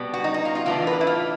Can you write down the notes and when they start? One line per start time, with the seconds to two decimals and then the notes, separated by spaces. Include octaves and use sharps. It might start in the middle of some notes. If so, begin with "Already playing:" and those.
Already playing: B2 G3 B3
0.14 F#4
0.24 D#4
0.34 D#4
0.45 F4
0.55 F4
0.66 A2 E3 G3 B3 D4 F4
0.87 B4
1.01 E4
1.07 F4